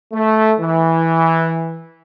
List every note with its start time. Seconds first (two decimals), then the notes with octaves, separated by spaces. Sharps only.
0.13 A3
0.60 E3